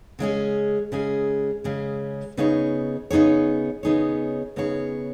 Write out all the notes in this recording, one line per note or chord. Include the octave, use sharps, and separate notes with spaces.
C#3 G#3 C#4 G#4
C#3 G#3 C#4 G#4
C#3 G#3 C#4 G#4
C#3 B3 D#4 G#4 C#5
C#3 B3 D#4 G#4 C#5
C#3 B3 D#4 G#4 C#5
C#3 B3 D#4 G#4 C#5